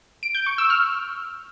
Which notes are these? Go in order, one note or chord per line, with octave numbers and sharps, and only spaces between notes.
D7
G6
C#6
E6
F6